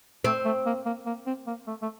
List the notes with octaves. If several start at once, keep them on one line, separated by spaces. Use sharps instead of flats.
A3 C4
A3
A#3
A#3
A#3
C4
A#3
A3
A3